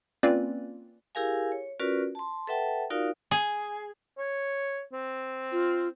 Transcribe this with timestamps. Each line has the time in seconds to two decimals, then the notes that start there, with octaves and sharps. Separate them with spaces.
0.23 A#3 C4 C#4 F4 B4 D5
1.15 E4 G4 G#4 A#4 F5 G#5
1.52 C#5
1.80 C#4 F4 F#4 A#4 B4 D5
2.15 A5 C6
2.47 A4 B4 E5 F#5 G5 A5
2.90 D#4 F4 F#4 A#4 D5 F5
3.31 G#4
4.18 C#5
4.93 C4
5.52 F4